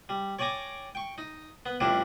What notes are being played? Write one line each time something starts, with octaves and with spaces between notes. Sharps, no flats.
G3
C#5 D5 G5 G#5 A#5 D6
G5 C#6
D#4
B3
A1 F2 G3 D4 E4 G4